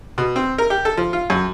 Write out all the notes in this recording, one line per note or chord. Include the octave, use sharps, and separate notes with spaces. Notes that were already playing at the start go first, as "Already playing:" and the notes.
B2
C4
A#4
G4
A4
F3
F4
F#2